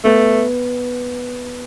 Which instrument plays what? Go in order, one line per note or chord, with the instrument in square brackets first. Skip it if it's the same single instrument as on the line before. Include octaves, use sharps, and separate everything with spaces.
[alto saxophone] A3 [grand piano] B3